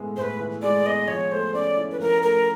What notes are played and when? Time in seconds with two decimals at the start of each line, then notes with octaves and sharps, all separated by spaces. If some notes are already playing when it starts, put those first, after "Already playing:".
Already playing: A2 E3 G#3 B3
0.16 A2 B4 C5
0.40 E3
0.62 G#3 D5
0.86 B3 D#5
1.08 F3 C#5
1.31 A3 C5
1.54 C#4 D5
1.77 E4
1.91 B4
2.00 F3 A#4
2.22 A3 A#4